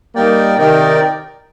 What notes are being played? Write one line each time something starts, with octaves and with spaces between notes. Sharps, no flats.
G3 A#3 D#4 A#4 D5 G5
C3 D#3 D#4 A#4 D5 G5